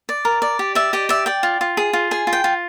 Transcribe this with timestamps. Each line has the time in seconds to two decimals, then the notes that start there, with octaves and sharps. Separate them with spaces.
0.09 D5
0.25 A#4
0.42 D5
0.59 G4
0.75 D5 E5
0.93 G4 D#5
1.09 D5 E5
1.26 D5 G5
1.43 F4
1.61 F4
1.77 G#4
1.93 F4
2.11 G#4 G#5
2.27 F4
2.33 G5
2.44 F4